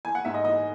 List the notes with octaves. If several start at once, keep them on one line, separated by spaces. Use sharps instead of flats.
E3 G#5
F#5
G#2 E5
D#5
E3 D#5